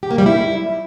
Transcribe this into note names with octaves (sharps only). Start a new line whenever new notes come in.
G4
A#3
G3
E4